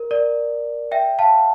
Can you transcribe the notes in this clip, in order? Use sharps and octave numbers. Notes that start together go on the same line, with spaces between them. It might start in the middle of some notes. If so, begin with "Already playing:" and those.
Already playing: A#4
A#4 D5
E5 G5
F5 A5